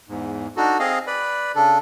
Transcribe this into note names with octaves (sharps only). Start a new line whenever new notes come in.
E2 G#2
D4 D#4 F#4 A4
C4 G#4 D#5 F5
B4 D5 B5
C#3 D4 A4